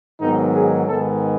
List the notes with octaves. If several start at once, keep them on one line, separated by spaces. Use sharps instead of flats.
G#2 D#3 F#3 B3 D#4
G#4
G#2 D#3 G#3 B3 A4